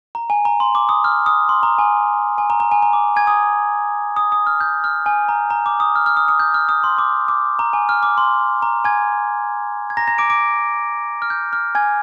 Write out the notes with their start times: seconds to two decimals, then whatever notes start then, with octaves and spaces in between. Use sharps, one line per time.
0.15 A#5
0.30 G#5
0.45 A#5
0.60 C6
0.75 D6
0.89 D#6
1.04 F6
1.26 D#6
1.49 C6
1.63 A#5
1.78 G#5
2.38 G#5
2.50 A#5
2.60 A#5
2.71 G#5
2.82 A#5
2.93 D6
3.16 G#5 G#6
3.27 D#6
4.16 D#6
4.32 D#6
4.47 F6
4.60 G6
4.84 F6
5.06 G#5
5.29 A#5
5.50 A#5
5.66 D6
5.80 D#6
5.96 F6
6.06 F6
6.17 D#6
6.28 D#6
6.40 G6
6.54 F6
6.69 D#6
6.84 C6
6.98 D6
7.28 D6
7.59 A#5
7.73 G#5
7.89 F6
8.03 D6
8.18 C6
8.62 A#5
8.84 G#5 G#6
9.90 G#6
9.97 A#5 A#6
10.08 A#5 A#6
10.18 D6 D7
10.30 D6 D7
11.22 F6
11.30 G6
11.53 F6
11.75 G#5 G#6